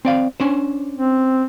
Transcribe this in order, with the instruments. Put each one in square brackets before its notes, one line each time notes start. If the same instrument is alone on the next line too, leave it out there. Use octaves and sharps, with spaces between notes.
[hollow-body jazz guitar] C4 D5 F5
C#4 D4 C5
[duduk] C4